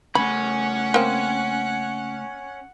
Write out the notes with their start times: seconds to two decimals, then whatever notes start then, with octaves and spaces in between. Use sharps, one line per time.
0.15 C#3 A3 C#4 F#5 G#5 B5
0.94 A#3 C4